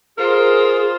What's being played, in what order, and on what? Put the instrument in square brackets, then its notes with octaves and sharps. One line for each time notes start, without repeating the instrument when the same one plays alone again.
[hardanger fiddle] F4 C5 [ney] G#4 [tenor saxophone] A#4